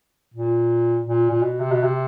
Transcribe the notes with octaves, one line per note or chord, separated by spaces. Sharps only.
A#2
A#2
A#2
B2
C3
B2
C3